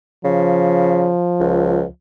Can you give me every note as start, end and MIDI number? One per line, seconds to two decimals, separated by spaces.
0.25 1.10 49
0.25 1.87 53
1.40 1.84 37